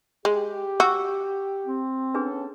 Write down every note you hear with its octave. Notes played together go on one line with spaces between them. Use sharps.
G#3 G4
F#4 C#6 E6
C4
B3 C#4 D4 G#4 A4 B4